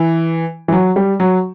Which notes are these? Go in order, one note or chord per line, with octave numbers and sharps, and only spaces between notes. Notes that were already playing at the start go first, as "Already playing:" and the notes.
Already playing: E3
E3
F#3
G3
F#3